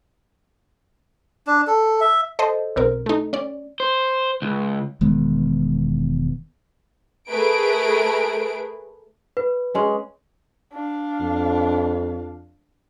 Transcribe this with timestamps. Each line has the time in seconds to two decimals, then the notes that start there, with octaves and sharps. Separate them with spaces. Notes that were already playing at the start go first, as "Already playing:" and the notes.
1.47 D4
1.67 A4
2.01 E5
2.39 A4 C5 D#5
2.76 B1 C4 A#4
3.06 A3 D#4
3.33 C#4 D5
3.80 C5
4.42 C#2
5.01 E1 D#3 G#3 B3
7.29 A3 G#4 A#4 B4 D7
9.37 B4
9.75 G#3 C#4
10.73 D4 F5
11.20 F2